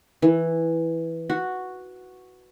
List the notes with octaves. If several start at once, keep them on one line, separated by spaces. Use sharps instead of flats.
E3
F#4